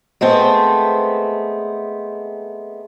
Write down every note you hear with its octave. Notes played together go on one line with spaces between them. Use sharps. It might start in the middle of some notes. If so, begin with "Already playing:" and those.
G#3 A3 B3 C4